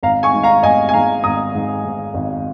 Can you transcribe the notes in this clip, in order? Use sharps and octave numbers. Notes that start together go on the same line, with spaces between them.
G#1 F5 A#5
G#5 C#6
G#2
F5 A#5
G#1 D#5 G#5
G#5
G#2 F5 A#5
G#1 A#5 D#6
G#2
G#2
G#1